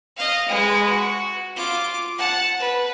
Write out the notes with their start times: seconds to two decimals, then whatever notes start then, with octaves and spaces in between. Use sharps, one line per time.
0.17 D#5 F5
0.49 G#3 B4
0.90 F#4
1.56 F4 D6
2.18 F#5 A5
2.60 B4